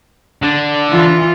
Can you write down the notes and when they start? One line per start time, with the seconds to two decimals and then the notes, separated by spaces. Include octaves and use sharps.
0.42 D3
0.89 E3 F4